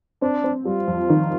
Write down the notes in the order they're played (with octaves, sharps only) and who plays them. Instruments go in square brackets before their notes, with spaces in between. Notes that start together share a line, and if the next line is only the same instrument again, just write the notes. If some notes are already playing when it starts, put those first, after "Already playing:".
[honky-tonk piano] C4 [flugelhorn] D4
[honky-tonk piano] C4
[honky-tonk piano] G3 [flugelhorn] F4
[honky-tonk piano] F2
D#3